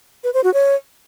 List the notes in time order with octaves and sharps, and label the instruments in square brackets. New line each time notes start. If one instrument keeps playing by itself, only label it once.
[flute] B4
C5
F#4
C#5